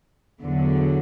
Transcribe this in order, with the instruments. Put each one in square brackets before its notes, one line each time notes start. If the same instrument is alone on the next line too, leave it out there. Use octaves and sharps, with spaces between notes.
[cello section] E2 D3 F#3